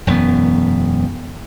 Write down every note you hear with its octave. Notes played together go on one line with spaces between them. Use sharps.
E1 F#2 E3 B3